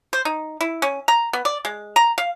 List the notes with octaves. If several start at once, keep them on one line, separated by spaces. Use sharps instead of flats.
C5
D#4
E4
C#4
A#5
B3
D5
G#3
A#5
F5